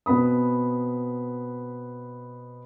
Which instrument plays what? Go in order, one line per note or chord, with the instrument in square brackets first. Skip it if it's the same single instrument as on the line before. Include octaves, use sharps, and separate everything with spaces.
[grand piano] B2 B3 C4 B5 D#6